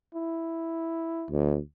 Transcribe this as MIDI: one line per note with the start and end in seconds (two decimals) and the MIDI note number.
0.15 1.29 64
1.31 1.59 38